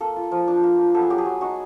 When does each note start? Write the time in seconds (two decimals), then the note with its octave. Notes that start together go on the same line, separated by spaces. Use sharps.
0.01 A#3 A4
0.16 F4
0.32 F3
0.48 D4
0.63 A#3
0.78 F4
0.94 B3 A4
1.02 G#4
1.10 F#3 G4
1.18 G#4
1.25 F#3
1.41 D#4 F#4